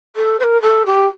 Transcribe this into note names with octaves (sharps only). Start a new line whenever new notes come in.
A4
C5
A#4
A4
G4